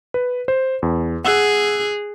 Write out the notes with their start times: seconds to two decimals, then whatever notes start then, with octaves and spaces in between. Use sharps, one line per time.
0.14 B4
0.48 C5
0.82 E2
1.25 G#4 F#5 E6 F#6